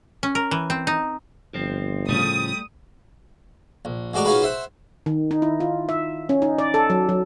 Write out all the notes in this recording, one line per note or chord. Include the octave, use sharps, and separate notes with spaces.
C#4
A#4
E3
C4
D#4
G1 F3 C4
A2 C#3 F3 G3 A3 D#6
A#1
A1 G#3 F#4 D5 A#5
C#4 D#4 F4 F#4 G#4 B4
C5 E5 F#5
D#3
D#4
E4
F4
E5
C#4
D#4
D5
A4
F#3
F#3